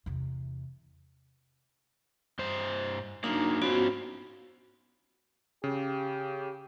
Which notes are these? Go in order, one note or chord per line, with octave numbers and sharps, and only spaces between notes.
E2 C3
G2 C5
F#3 A#3 D4 D#4 A#5
B3 C#4 F4 F#4 C5
C#3 G4